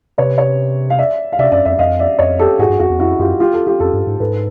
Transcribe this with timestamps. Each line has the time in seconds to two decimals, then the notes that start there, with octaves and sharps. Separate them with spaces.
0.18 C3 B4 C#5
0.38 B4 C#5
0.90 F5
0.98 D5 E5
1.32 F5
1.39 C3 D5 E5
1.52 F#2 D5 E5
1.65 F2 D5 E5
1.79 F2 D#5 F5
1.99 D5 E5
2.19 F2 C#5 D#5
2.39 G4 A4
2.59 G#2 F#4 G#4
2.70 G2
2.79 F2 F#4 G#4
2.90 E2
3.00 F2 E4 F#4
3.19 F#2 F4 G4
3.40 F4 G4
3.53 G4 A4
3.67 F4 G4
3.80 F2 G4 A4
3.93 G2
4.07 G#2
4.20 G#2 A4 B4